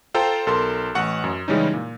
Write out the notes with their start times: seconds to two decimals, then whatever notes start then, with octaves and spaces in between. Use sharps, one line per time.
0.14 F4 A4 C5 G5 A#5
0.47 B1 A4 A#4 C6
0.95 A1 F#5 C#6
1.24 F#2
1.48 C#3 E3 G3 G#3 C#4 D#4
1.74 A#2